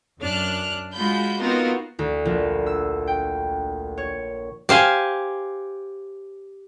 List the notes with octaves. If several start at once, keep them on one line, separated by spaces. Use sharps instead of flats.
F#2 D4 F6 F#6
G#3 F4 F#4 B5 G6
B3 C4 D#4 F4 F#4 A#4
D2
A#1
E6
G5
C#5
G4 C5 F5 G#5